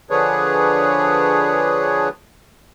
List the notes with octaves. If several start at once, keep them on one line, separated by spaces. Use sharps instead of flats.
D3 F3 D4 G#4 B4 C#5